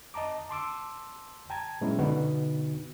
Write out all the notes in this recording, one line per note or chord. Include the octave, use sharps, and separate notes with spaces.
D#5 A5 A#5 D6
A5 C6 D6 E6
G5 A5 A#5 G#6
A#2 F#3 G#3 B3 C#4 E4
B2 D3 B3 D#4 F#4